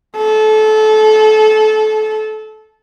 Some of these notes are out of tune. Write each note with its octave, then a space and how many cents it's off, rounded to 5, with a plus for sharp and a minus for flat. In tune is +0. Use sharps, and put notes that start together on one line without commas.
A4 -25